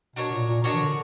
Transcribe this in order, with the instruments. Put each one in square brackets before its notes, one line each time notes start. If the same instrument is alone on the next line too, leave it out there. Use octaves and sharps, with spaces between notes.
[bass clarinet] B2 [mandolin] D4 F#4 A#4 C#5
[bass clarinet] A#2
A#2
[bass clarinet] B2 [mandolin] D4 F#4 A#4 C#5
[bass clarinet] E3
D3